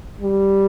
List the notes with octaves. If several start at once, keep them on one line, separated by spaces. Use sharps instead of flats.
G3